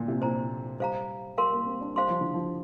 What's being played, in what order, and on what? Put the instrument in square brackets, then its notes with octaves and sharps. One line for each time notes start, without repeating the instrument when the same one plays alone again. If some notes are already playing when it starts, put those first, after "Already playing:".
Already playing: [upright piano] A#2 D3 D4
C3
[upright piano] A#2 [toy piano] C5 A#5
[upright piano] G3 [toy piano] C5 F5 A#5
[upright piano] G3 [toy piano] A#4 F5 C6
[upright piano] A#3
C4
D4
[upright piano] G3 [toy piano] C5 F5 C6
[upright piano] F3
D3
F3